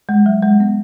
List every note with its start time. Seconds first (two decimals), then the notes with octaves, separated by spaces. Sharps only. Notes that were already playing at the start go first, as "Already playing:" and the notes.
0.09 G#3
0.26 F#3
0.43 G#3
0.60 B3